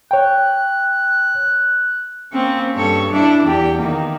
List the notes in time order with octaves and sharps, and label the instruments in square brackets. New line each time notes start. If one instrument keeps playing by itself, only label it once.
[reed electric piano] C#5 G5 [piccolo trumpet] F#6
[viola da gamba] A#3 C4 C#4
G2 A4 C#5
D4 E4 D5
E2 G4
D#3 A#3